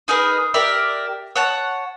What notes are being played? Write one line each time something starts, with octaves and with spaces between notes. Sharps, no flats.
D#4 G#4 A#4 B4
G4 A#4 D5 E5
C#5 F#5 A5